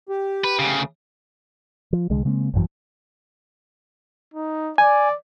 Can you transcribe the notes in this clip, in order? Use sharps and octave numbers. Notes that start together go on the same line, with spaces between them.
G4
B4
D2 C#3
F3
C2 D3 G#3
C#3 G#3 A#3 C4
G#1 F#2 E3 F#3
D#4
D5 G#5